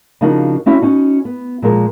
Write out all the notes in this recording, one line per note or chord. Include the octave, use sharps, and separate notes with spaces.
C#3 F3 D4 D#4 F#4 A#4
C4 C#4 E4 F#4 C#5 E5
C#4 D#4 F#4
B3
A#2 F3 G#3 A#4